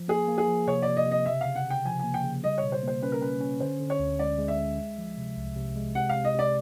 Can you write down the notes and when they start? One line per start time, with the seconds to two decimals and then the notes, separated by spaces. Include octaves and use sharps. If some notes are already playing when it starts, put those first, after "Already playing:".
Already playing: F3
0.08 A#3 G#4
0.28 A#3
0.38 G#4
0.48 F3
0.67 C3 C#5
0.82 C3 D5
0.97 D#5
1.06 C3
1.11 D#5
1.26 C#3 E5
1.41 C#3 F5
1.55 F#5
1.65 C#3
1.70 G5
1.85 F3 G#5
1.99 A#3 G#5
2.14 G5
2.24 C#3
2.44 G3 D#5
2.58 C#5
2.63 B2
2.72 C5
2.83 A#3 C5
3.02 C#4 B4
3.12 A#4
3.21 C#4 B4
3.41 C#4
3.60 D3 C5
3.80 D3
3.90 C#5
4.00 D2
4.19 G#3 D5
4.39 G#3
4.48 E5
4.58 G#3
4.78 G#3
4.98 F3
5.18 C3
5.37 C2
5.56 C3
5.76 G#3
5.95 C3 F#5
6.09 F5
6.15 C3
6.25 D#5
6.35 C3 D5